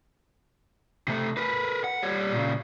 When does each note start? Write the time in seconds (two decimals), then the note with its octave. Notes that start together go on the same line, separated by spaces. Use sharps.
1.08 C3 A3
1.37 A#4 B4
1.84 F#5
2.03 G3 C#5
2.32 A#2 C#3